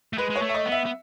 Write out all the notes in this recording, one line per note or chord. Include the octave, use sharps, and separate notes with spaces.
A3
G#3 B4
G#3
C#5
A3
E5
D#5
B3
E5
B3